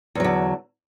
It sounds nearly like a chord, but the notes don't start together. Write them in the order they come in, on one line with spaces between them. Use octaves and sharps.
E2 F#3 D3